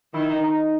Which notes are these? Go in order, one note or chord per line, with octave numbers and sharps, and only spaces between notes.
D#3 E4
D#4
D#4